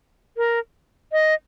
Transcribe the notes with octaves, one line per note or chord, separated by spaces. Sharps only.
A#4
D#5